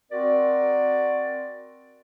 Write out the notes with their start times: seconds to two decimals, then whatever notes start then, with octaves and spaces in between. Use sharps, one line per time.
0.11 C4 F#4 A#4 D5